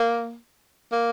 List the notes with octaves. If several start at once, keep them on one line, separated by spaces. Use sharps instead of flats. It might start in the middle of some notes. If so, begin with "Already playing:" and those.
Already playing: A#3
A#3